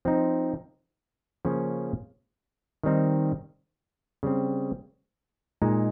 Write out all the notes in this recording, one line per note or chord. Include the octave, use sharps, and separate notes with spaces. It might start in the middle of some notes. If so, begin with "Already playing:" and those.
F3 C4 D#4
C#3 F3 A#3 C#4
D#3 G3 C4 D#4
C#3 G3 C4
A#2 G#3 D#4